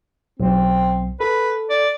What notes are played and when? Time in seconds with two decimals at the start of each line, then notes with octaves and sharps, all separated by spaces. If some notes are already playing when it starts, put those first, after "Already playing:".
0.40 B1 C4
1.20 A4 B4
1.70 D5